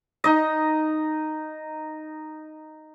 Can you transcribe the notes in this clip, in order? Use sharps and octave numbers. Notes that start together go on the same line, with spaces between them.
D#4 D#5